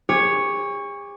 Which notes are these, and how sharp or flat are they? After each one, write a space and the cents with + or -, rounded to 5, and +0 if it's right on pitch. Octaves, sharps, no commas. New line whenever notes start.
G#4 -45 C#5 +0 D6 +10